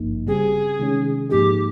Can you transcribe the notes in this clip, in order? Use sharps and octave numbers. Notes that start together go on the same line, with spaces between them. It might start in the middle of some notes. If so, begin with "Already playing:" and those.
Already playing: G#1 G2 F3 A#3 D#4
C#3 G3 C4 G4 G#4
C3 D#3 G#3 C#4
G#2 F3 A#3 D#4 G4 G#4